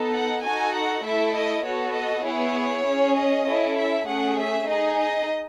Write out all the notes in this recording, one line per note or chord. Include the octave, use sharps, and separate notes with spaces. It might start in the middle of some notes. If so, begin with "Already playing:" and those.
Already playing: B3 D#4 A4
F#5
D#4 F#4 A4 G#5
F#5
A3 E4 A4 E5
D#5
B3 F#4 A4 C#5
D#5
B3 E4 G#4 C#5
C#4 G#4
D#5
C#4 E4 A4
E5
A3 C#4 G#4 F#5
E5
D#4 G#4 D#5
D#5